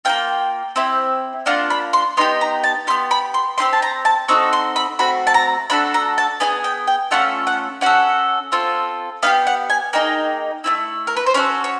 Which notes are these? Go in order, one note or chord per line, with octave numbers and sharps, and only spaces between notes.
A#3 C#4 F4 G5
C4 E4 G4
A#3 D4 F4 F#5
B5
C6
B3 D#4 G4 C6
A#5
A5
B3 E4 G4 C6
B5
C6
C4 D#4 G4 C6
A5
A#5
A5
C4 D#4 F#4 A4 C#6
C6
B5
A3 C4 F#4 B5
A5
A#5
A3 D4 F#4 A4 B5
A#5
A5
B3 D#4 G#4 G#5
G5
G5
A3 C#4 F4 A4 F#5
F#5
C#4 F#4 A4 F#5
C4 F4 A4
B3 D#4 G4 F5
F#5
G#5
A#3 D#4 G#4 G5
A3 C#4 E4
A#4
B4
C5
C#4 F#4 A4 C#5
C#5